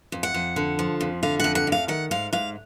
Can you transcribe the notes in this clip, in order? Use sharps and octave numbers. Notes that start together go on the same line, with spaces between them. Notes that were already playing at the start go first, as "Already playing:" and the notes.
F2
F#5
F2
D3
F3
F2
D3 F5
F2 F#5
F#5
F2 F5
D#3 F#5
G#2 F5
G#2 F5